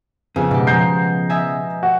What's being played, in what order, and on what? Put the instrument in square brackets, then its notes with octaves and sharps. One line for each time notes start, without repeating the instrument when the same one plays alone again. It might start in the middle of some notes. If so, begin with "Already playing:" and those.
[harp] F2 [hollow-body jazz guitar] C#3 B3 G#4
[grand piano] G#2 [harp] B2 G4
[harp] F3 G#3 [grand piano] A#5 G6 C7
[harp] D#5 E5 G#5
[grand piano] F#4